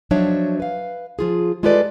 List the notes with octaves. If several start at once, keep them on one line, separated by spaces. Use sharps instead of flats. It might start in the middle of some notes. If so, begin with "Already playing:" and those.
F3 F#3 D4 D#4 C#5 E5
B4 F5
F3 F4 G#4
G#3 F4 G4 A4 B4 D5